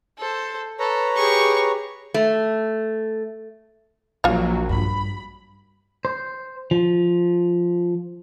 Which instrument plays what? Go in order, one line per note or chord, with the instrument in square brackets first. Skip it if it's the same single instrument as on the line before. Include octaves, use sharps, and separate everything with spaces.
[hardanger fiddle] A4 C5
[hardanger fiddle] A4 [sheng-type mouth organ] B4 C#5 A#5
[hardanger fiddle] G4 G#4 [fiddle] C#6
[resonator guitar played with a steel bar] A3
[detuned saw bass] A#1 [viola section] F#3 A#3 F#4 [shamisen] F4 F5
[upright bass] G2 [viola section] B5
[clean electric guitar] C5
F3